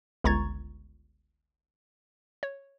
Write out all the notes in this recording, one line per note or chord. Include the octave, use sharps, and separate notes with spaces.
G1 C#2 A#5 C#6 G#6 A6
C#5